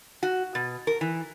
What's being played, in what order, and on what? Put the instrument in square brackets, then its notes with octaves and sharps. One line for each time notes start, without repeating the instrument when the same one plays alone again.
[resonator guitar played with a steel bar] F#4
B2
A#4
E3